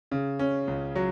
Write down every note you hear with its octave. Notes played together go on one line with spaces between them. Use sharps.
C#3
C#4
C#2
F#3